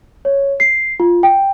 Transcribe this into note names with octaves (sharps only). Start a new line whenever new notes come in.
C#5
C7
F4
G5